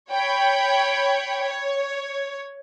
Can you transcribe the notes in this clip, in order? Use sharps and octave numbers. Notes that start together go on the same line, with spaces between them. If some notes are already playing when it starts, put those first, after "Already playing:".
C#5 G5 B5
C#5